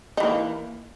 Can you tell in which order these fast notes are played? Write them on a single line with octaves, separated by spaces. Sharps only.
D#4 E3 A#3